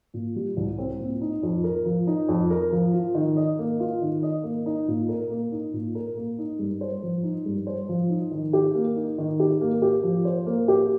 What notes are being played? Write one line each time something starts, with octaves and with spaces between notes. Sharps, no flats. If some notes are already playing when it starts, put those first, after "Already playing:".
A#2
G3
C2
C4
A#2
D#4
F2
A#4
F3
D#4
F2
A#4
F3
F4
D#3
D#5
A#3
F4
D#3
D#5
A#3
D#4
A#2
A#4
A#3
D#4
A#2
A#4
A#3
D#4
G2
C5
F3
D#4
G2
C5
F3
D#4
D#3
G4
A#3
D#4
D#3
G4
A#3
G4
F3
C5
A#3
G4